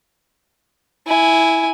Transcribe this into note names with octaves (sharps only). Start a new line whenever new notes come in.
E4 G#5